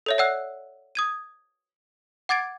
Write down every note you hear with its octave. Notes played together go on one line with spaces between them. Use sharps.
A4 C#5 E5
C#5 D5 F#5 E6 F#6
D#6 G#6 D#7
F#5 D6 G#6 A6 D7